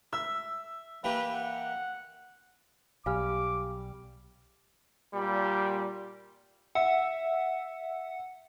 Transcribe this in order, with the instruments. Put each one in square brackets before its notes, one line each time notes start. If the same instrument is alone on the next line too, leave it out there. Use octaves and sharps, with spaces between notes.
[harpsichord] E5 [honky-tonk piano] E6
[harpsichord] E3 A#3 G4 [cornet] B4
[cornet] F#5
[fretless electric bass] B1 [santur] G3 E6 [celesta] F5 G#5 F6 [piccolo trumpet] D6
[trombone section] A#2 G3
[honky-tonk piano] E5 [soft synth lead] F#5